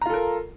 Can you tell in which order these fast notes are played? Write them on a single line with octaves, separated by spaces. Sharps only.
A#5 F4 A4 A#4